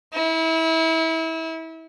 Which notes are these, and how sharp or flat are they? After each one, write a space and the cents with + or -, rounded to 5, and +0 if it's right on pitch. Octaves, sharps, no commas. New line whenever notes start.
E4 -30